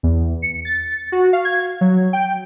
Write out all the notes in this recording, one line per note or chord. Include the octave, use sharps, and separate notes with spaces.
E2
C#7
A6
F#4
F5
G#6
F#3
G5